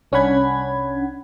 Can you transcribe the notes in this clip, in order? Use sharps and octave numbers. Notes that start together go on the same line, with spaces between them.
C2 C#4 D4 F#5 B5 G#6